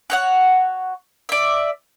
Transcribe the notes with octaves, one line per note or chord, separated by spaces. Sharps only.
F#4 C#5 F#5
D5 E5